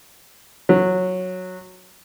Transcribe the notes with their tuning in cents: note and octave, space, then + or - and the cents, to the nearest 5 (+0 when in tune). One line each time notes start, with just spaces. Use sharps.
F#3 -10